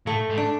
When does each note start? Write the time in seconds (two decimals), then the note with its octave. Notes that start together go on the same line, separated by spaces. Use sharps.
0.06 A2 A3
0.30 G#2
0.37 D4